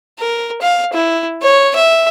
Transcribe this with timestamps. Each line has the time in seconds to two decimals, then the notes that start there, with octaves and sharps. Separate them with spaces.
0.19 A#4
0.62 F5
0.94 E4
1.42 C#5
1.75 E5